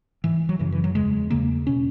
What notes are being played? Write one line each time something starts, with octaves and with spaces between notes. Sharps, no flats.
G#2 E3
F#3
F#2 C#3 E3
E3
F#3
E2 C#3 G#3
E2 C#3 A#3
B2 C#4